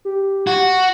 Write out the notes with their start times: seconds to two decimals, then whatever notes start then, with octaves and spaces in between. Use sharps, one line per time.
0.05 G4
0.47 F#4